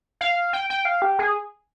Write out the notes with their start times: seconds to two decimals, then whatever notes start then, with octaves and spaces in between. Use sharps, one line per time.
0.21 F5
0.53 G5
0.70 G5
0.85 F5
1.02 G4
1.19 G#4